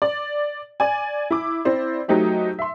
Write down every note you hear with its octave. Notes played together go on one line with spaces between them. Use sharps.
D5
D5 G#5
E4 D6
C4 E4 C5 D5
F#3 A3 D#4 G4 C5
E5 C6